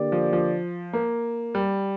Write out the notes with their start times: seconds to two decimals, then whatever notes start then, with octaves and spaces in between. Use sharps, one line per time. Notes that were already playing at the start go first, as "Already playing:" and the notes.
Already playing: D3 A#3 G4 D5
0.12 F3
0.33 F3
0.93 A#3
1.55 G3